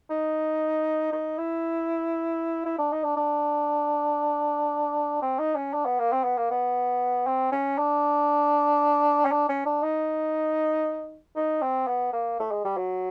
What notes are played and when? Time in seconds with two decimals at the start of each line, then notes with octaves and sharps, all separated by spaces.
0.10 D#4
1.13 D#4
1.38 E4
2.66 E4
2.78 D4
2.92 D#4
3.04 D4
3.17 D4
5.22 C4
5.39 D#4
5.56 C#4
5.73 D4
5.85 B3
5.99 A#3
6.12 C4
6.24 B3
6.37 A#3
6.50 B3
7.27 C4
7.52 C#4
7.78 D4
9.25 C#4
9.32 D4
9.49 C#4
9.66 D4
9.83 D#4
11.36 D#4
11.62 C4
11.87 B3
12.13 A#3
12.40 A3
12.51 G#3
12.64 G3
12.77 F#3